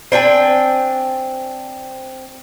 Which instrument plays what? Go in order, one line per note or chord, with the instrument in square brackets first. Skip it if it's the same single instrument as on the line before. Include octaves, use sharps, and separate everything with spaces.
[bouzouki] C4 D4 G5 G#5